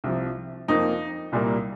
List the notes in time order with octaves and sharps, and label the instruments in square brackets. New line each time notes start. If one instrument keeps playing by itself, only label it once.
[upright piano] C2 C3 F3
F2 F3 A#3 D#4
C2 A#2 G3 A#3